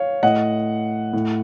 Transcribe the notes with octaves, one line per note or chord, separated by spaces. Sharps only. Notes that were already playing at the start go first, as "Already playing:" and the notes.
Already playing: C#5 F5
A2 D#5 F#5
A2